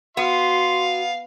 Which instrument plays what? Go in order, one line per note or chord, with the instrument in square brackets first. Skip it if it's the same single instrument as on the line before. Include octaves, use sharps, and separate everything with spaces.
[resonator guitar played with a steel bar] B3 [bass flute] F#4 [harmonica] F5 [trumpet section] C6